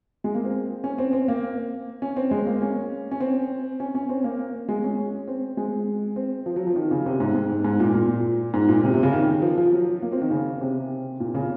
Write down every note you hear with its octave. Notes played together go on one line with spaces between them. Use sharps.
G#3
A#3
C4
C#4
C4
C4
A#3
C#4
C4
G#3
A#3
C#4
C#4
C4
C#4
C#4
C4
A#3
G#3
C#4
C4
G#3
C4
F3
F#3
F3
D#3
C#3
C3
G#2
G#2
G#2
A#2
A#2
G#2
A#2
C3
C3
C#3
D#3
F3
F3
F#3
A#3
C4
D#3
C#3
C3
A#2
C#3